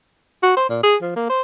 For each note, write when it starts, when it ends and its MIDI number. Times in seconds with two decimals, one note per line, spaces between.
0.43 0.56 66
0.57 0.65 72
0.69 0.81 46
0.83 0.96 68
1.02 1.16 53
1.16 1.28 58
1.29 1.42 72